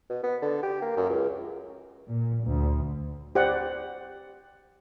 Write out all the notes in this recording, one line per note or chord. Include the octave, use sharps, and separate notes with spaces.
B2
B3
D3
G4
A#3
F#2
C#2
A#2
D2
G4 C5 D5 F#5